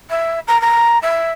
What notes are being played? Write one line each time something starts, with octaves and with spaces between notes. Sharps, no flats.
E5
A#5
A#5
E5